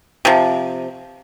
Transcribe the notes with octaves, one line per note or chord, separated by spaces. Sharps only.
C3 F3